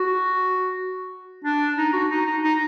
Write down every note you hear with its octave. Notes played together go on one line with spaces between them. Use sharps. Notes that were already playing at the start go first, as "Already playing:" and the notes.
Already playing: F#4
D4
D#4
F#4
D#4
D#4
D#4